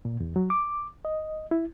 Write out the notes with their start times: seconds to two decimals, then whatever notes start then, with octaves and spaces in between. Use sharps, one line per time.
0.05 A#2
0.20 E2
0.36 F#3
0.50 D6
1.05 D#5
1.51 E4